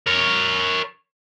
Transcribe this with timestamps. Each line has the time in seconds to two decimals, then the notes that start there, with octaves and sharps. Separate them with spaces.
0.07 A#4 C#5